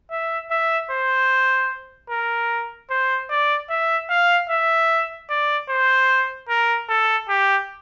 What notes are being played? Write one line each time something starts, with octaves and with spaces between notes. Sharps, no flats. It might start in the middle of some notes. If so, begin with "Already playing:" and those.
E5
E5
C5
A#4
C5
D5
E5
F5
E5
D5
C5
A#4
A4
G4